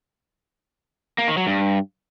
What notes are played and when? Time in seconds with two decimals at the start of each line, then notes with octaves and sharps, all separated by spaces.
1.18 A#3
1.28 D#3
1.37 F#3
1.47 G2